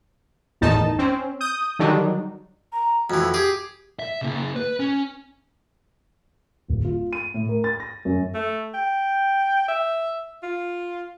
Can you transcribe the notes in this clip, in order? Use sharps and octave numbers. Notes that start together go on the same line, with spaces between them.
G1 E2 A2 D#3 D#4 A5
C4 C#4
D#6 G6
D3 D#3 F#3 G3 D4 D#4
A#5
F2 E3 F#4
G4 G#4
E5
C#3 A#3
B4
C#4
D1
F4
D#7
A2
A#4
A6
A#6
F#2
A3
G5
E5
F4